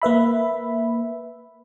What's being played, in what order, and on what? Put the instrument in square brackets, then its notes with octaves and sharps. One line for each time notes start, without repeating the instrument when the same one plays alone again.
[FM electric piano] A#3 B4 E5 B5